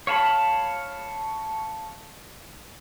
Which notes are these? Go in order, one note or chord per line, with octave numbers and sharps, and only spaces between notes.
C#5 F5 A5 B5